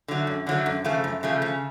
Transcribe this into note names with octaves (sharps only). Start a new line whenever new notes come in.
D3 F#3 A3
F#2
D3 F#3 A3
F#2
C#3 F3 A3
F#2
C#3 F3 A3
C#3